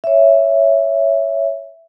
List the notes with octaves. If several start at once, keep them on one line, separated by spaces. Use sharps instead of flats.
C#5 E5